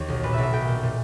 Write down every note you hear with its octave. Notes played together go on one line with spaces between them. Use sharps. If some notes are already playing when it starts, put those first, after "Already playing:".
Already playing: D#2 D#3 C#5
B1
A#2 B4
E5
B1
E5
B1 G5
A#2
A#2